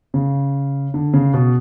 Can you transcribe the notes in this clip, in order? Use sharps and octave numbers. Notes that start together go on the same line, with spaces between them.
C#3
D3
C#3
B2